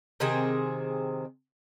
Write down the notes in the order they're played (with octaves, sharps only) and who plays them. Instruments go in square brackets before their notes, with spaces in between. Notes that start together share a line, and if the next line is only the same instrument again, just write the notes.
[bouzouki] C3 D#3 C4 G#4